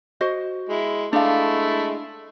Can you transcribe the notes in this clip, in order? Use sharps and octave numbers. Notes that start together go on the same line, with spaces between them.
F#4 C5 D#5
G#3 E4
G#3 A3 D4 E4 F5